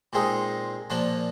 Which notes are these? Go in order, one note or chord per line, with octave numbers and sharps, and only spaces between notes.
A#2 G#3 C4 D#4
A#2 F3 A#3 D4